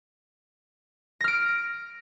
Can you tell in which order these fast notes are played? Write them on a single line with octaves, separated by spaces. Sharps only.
A#6 F6 D7